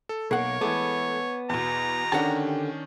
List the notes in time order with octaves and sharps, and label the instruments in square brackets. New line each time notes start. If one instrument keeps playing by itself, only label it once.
[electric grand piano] A4
[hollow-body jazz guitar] B1 F#5 [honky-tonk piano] A#3 [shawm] C#5 [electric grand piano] C7
[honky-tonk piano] E3 G#3 A3 [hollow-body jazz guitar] B3 [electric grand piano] A5 D6 G#6
[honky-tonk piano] E2 B2 [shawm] A#5
[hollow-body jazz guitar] D3 F#5 A5 [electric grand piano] D#3 C#4 D4 [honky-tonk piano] G4